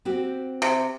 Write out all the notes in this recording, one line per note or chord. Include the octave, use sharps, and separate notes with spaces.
C4 F#4 G4
C3